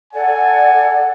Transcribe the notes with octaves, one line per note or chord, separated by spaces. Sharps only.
A4 D5 F#5 G#5